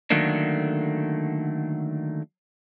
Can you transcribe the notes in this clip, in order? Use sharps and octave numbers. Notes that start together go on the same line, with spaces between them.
D3 D#3 F#3 A3 A#3 D4